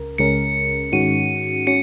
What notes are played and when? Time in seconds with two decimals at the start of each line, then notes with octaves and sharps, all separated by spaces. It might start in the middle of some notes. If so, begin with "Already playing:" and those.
Already playing: C#2 C#3 A#4
0.18 C#2 C#3 G#3 C#4 A#4 C#7
0.92 G#2 D#3 G#3 C#4 F#4 D#7
1.67 C#4 F#4 C#7